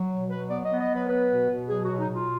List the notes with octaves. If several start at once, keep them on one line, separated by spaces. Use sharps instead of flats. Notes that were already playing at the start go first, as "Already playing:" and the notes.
Already playing: F#3
B2
F#3 B4
B3 D5
D#5
B3
D#5
F#3 B4
B3 B4
B2
B2
F#3 G#4
B2 F#4
D#4
B2
F4